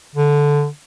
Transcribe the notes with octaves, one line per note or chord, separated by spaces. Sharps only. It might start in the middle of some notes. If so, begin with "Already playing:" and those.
D3